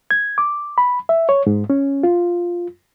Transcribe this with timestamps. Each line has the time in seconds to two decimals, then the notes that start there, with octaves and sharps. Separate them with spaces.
0.11 G#6
0.38 D6
0.78 B5
1.09 E5
1.29 C#5
1.47 G#2
1.70 C#4
2.03 F4